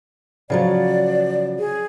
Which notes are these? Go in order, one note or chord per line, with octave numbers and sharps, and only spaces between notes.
C#3 F3 F#3 D5
G#4